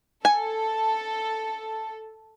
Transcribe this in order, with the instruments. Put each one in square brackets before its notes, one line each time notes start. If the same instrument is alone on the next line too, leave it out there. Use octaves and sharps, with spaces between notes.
[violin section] A4 [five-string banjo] G#5